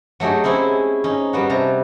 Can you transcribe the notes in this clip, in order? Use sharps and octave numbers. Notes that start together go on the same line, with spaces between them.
F#3 A3 D#4 G4 G#4
C4 C#4 E4 G#4 C#5
C#4 D#4
G3 B3 F#4
C3 A5 A#5